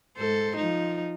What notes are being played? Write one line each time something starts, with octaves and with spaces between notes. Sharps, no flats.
G#2 A4 C5
F3 D#4